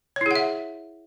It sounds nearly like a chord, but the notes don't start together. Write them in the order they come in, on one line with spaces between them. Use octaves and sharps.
C#5 E4 G#4 F#5 E5